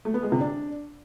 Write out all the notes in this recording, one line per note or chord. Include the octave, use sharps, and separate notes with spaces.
A3
B3
G#3
C3
D4